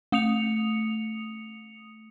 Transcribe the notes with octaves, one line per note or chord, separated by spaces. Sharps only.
A3 D#6 C#7 F7